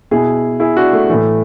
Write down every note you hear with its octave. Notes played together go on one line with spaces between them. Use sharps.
B2 E4 G#4
E4 G#4
D4 F#4
A3
A2 E3 A3